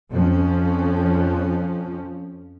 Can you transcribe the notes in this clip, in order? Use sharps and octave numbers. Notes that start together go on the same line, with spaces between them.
F2 F3 C#4